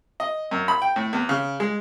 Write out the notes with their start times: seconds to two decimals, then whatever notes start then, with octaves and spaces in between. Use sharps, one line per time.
0.20 D#5
0.51 F#2
0.68 B5
0.82 G5
0.96 A2
1.13 E2
1.29 C#3
1.60 G#3